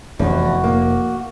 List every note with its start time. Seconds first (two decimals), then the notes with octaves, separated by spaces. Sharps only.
0.19 F1 E2 F#4
0.64 A#3